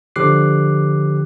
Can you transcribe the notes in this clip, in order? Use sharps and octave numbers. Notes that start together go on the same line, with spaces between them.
D3 F3 G4 D6 F#6 C7